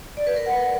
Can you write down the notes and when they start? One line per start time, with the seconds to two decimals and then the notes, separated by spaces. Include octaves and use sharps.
0.17 D5
0.27 B4
0.36 A#4
0.46 F#5